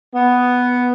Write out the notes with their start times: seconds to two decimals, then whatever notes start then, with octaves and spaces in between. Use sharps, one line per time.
0.13 B3